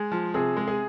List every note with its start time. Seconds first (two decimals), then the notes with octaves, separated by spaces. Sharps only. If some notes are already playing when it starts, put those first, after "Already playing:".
Already playing: G#3 G#4
0.12 F3
0.34 C3 G#4
0.57 G#3
0.67 G#4